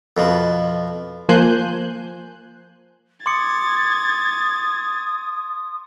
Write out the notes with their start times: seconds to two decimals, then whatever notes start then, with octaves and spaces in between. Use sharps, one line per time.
0.17 F2 B2 F3
1.29 F3 A#3 C5 G#5 F#6 G6
3.26 C6 D6 D#6 G#6 A6 C#7